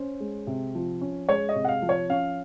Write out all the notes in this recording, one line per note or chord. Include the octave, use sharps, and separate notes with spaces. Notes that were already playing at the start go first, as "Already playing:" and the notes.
Already playing: C#4 C5
G#3
C3
F3
C#4
G#3 C#5
D#5
C3
F#5
F5
F3
C#5
C#4 F5